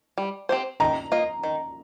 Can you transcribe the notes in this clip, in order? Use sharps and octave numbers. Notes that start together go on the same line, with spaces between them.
G3
C4 G4 C5
D#3 A#5
A#3 F4 D#5
D#3